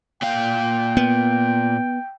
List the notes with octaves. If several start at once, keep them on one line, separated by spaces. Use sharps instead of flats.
A#2 F5 G5
B3